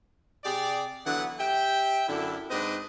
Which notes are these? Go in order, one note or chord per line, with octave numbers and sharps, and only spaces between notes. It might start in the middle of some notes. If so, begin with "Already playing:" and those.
C3 G4 G#4 D5
D3 E3 F#3 B3 F#5
G4 E5 G5
F#2 D3 E4
G#2 C4 D4 B4 D#5